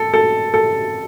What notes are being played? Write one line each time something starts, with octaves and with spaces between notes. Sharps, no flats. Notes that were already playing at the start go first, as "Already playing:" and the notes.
Already playing: A4
A4
A4